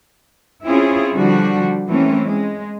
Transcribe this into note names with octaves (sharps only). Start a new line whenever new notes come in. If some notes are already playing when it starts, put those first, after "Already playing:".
C4 C#4 E4 F4 G#4
D3 F3 G3 D4 F#4
E3 A3 A#3 C4 C#4
G#3